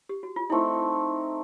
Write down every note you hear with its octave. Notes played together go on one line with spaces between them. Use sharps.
G4
F#4
F4
A3 C4 D#4 E4